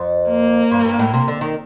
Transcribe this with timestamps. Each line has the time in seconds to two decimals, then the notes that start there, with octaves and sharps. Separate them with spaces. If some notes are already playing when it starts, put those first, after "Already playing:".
Already playing: F2
0.28 A#3
0.71 G2
0.85 G2
0.99 A2
1.14 C3
1.28 D3
1.41 D#3